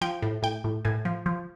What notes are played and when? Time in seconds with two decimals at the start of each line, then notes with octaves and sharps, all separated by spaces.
0.01 F3 G5
0.22 A2
0.42 A2 G5
0.64 A2
0.85 A2 G#5
1.05 F3
1.26 F3